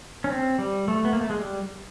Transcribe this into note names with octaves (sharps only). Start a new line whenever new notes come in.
C#4
C4
G3
A3
B3
A#3
A3
G#3
G3